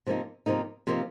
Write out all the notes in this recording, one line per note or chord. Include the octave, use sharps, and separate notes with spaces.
C3 F3 A#3 D#4
C3 F3 A#3 D#4
C3 F3 A#3 D#4